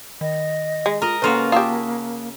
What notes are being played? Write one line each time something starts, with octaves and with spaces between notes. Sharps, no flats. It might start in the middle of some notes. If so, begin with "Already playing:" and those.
D#3 D#5
G#3
F4 A#4 D#5
C#3 A#3 C#4 F4 F#4 A4 B4
F4 G4 E5 A5 D#6